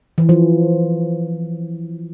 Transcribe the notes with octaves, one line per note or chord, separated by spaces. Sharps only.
E3
F3